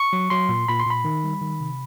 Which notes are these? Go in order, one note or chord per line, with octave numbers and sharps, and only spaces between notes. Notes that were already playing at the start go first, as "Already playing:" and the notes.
Already playing: C#6
F#3
F#3 C6
A#2
A#2 B5
C6
A#2 B5
D#3
G3
D#3
C3